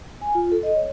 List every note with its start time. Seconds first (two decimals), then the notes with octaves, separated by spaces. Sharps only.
0.21 G#5
0.35 F4
0.52 A4
0.63 D#5
0.75 C#5